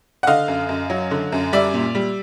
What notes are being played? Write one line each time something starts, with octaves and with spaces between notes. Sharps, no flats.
F#5
D3 D#5 F5
F#2
F#2
F#3
D3
F#2
G3 D5 E5
A#2
G3